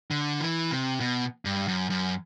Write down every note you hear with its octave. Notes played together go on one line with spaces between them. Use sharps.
D3
E3
C3
B2
G2
F#2
F#2